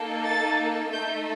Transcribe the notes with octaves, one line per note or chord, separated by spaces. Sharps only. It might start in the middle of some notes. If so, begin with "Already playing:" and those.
Already playing: A#3 D#4 A4
A6
A3 D#4 A4 G6